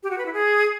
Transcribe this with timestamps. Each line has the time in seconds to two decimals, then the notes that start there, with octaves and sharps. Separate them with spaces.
0.03 G4
0.11 F#4
0.18 B4
0.26 E4
0.33 G#4